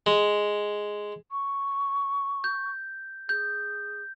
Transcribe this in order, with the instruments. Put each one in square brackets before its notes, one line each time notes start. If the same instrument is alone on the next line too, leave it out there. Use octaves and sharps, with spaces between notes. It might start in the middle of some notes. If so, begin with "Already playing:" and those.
[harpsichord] G#3
[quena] C#6
[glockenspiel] G6
[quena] G#4 [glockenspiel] G6